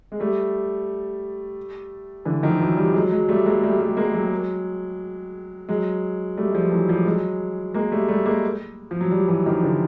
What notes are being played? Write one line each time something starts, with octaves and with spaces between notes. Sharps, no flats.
G#3
G3 A3
D3 E3
D#3 F3
E3 F#3
F3 G3
F#3 G#3
F#3 G#3
G3 A3
G#3 A#3
G3 A3
G3 A3
G#3 A#3
F#3 G#3
F#3 G#3
G3 A3
G#3
F3 G3
E3 F#3
F3 G3
F#3 G#3
G#3 A#3
G3 A3
G3 A3
G#3 A#3
F3
F#3
F3 G3
E3 F#3
D#3 F3
D3 E3